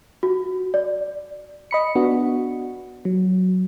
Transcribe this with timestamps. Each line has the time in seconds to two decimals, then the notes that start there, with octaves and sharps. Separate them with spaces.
0.23 F#4
0.74 D5
1.71 D#5 B5 C#7
1.95 B3 D4 F#4
3.05 F#3